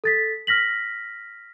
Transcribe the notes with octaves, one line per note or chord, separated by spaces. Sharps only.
A4 A6 B6
F6 A#6 B6 F#7